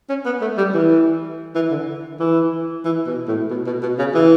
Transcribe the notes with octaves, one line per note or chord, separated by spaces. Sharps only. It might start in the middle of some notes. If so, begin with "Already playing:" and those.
C#4
B3
A3
G3
E3
E3
D3
E3
E3
B2
A2
B2
B2
B2
C#3
E3